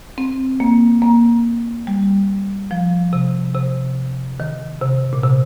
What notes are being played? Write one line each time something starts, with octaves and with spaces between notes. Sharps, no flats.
C4
A#3
A#3
G3
F3
C3
C3
D#3
C3
A#2
C3